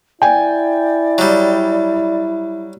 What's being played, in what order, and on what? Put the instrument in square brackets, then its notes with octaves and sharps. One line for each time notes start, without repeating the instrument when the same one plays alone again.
[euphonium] E4 [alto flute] D5 [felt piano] G5 G#5
[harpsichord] F#3 G3